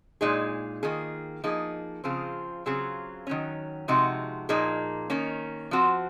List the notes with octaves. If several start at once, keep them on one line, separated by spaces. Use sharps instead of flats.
A#2 G#3 D#4 G#4
D#3 A#3 F4 G#4
F3 A#3 D#4 G#4
C#3 F3 C4 F4 G#4
C#3 F#3 C4 F4 G#4
D#3 F#3 C#4
C3 F3 G#3 D#4 F#4
A#2 F3 A#3 D#4 G#4
D#3 A#3 C#4
F3 C4 F#4